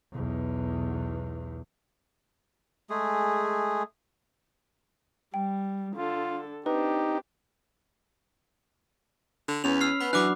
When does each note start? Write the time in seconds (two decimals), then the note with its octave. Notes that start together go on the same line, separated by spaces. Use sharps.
0.12 B1 E2
2.90 G#3 A3 G#4
5.34 G3 G5
5.95 D3 F4 A4
6.66 C4 D4 D#4 G4 B4
9.49 D3
9.64 E2 C#4 B4 F7
9.81 E6 F6 C7
10.00 B3 B5
10.13 E3 F#3 B3 D4 B5 D6 F#6